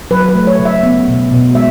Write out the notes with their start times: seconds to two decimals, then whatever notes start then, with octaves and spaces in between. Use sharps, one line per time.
0.11 F#3 B4
0.29 B4
0.35 A3
0.47 C#5
0.59 C#3
0.65 E5
0.83 B3
1.07 B2
1.31 B2
1.55 G#3 E5